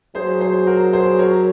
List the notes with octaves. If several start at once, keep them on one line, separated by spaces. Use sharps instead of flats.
F#3 G#4 C5
G#4 C5
F#4 A#4
G#4 C5
A#4 C#5